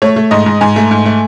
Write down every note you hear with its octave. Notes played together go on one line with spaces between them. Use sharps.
A3 C#5
A3
G#2 D#5
G#2
G#2 G#5
A3
G#2
A3